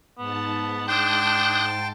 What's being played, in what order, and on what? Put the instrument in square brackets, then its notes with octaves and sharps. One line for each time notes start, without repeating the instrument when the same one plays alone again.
[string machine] G#2 A5 [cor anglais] B3
[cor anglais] D4 [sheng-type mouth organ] G5 C6 [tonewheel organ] D#6 F#6 G6